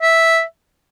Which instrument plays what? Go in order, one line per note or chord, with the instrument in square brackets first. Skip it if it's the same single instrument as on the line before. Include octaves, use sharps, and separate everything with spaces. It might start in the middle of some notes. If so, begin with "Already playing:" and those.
[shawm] E5